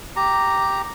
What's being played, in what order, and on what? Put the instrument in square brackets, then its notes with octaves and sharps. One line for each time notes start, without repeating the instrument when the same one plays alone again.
[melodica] G4 A#5